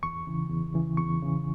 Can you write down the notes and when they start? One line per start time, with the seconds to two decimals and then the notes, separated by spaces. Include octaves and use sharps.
0.03 E2 C#6
0.27 C#3 E3
0.50 E2
0.74 C#3 E3
0.97 E2 C#6
1.22 C#3 E3